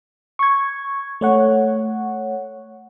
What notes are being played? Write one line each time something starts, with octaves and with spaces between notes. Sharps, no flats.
C#6 G#6
A3 C#5 F#5